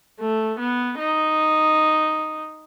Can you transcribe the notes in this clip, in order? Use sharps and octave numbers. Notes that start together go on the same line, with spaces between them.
A3
B3
D#4